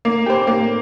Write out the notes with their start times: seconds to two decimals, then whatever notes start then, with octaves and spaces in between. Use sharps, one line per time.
0.05 A#3
0.26 G4 C5
0.47 A#3